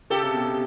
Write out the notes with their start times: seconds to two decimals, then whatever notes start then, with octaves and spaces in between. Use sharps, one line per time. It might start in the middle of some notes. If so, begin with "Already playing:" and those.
0.10 C#3 G4 A4
0.22 C3
0.33 B2
0.45 C3